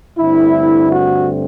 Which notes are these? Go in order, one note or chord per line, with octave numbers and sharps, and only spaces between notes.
G2 D3 A3 C4 E4
F#4